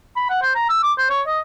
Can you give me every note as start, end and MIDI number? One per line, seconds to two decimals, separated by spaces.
0.16 0.26 83
0.30 0.40 78
0.42 0.52 72
0.55 0.66 82
0.69 0.79 88
0.83 0.93 86
0.98 1.09 72
1.10 1.22 73
1.27 1.39 75